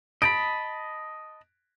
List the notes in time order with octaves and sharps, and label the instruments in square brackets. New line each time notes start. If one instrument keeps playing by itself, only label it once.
[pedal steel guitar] D#5 A5 B5 [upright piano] D7